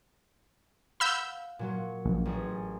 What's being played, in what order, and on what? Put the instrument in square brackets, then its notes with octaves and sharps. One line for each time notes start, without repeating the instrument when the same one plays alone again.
[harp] F5 F#5 [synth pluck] B5 E6 G6
[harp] A#2 F#3 F#4
[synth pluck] A#1
[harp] A1 C#4 G#4